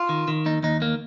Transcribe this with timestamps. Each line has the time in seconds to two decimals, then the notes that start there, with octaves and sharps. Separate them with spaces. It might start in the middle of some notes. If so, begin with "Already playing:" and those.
Already playing: F4
0.09 D#3
0.28 D#3
0.46 D#2 D#4
0.63 D#2 D#4
0.82 D#3 A#3